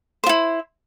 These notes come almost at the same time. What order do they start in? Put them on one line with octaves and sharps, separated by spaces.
C5 F4 E4